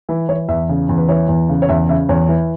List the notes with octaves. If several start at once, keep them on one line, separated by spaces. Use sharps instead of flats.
E3 E5
E3 C#5
E2 E5
C#3
E2
B4
E3 C#5
E2
C#3
C#5
E2 E5
C#3 E5
E2 C#5
E3